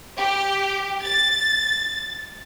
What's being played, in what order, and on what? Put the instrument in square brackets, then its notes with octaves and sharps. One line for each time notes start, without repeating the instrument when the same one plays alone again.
[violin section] G4
A6